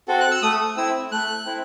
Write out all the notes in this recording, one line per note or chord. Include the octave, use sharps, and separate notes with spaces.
C4 F#4 A4
F#6
E6
A3 D#6
C4 E4 E6
A3 F#6
C4 E4